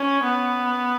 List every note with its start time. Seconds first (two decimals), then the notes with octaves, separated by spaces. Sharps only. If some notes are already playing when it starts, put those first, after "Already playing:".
Already playing: C#4
0.23 B3